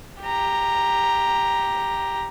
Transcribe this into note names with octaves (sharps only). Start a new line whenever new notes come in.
G4 A#5